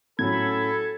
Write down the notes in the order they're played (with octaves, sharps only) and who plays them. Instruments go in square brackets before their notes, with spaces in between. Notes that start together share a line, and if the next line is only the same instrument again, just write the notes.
[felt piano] A2 F#3 C#4 [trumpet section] A4 [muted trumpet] B5 [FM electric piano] G#6